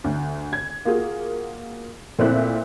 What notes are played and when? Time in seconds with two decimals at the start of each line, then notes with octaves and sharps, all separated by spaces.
0.04 D2
0.53 G#6
0.85 A#3 F4 F#4 G#4
2.19 A#2 A3 C4 E4 E5 F#6